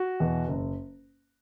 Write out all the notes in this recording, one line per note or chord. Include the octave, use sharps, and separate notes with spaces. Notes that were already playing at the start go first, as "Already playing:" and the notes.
Already playing: F#4
E2 B2
F#1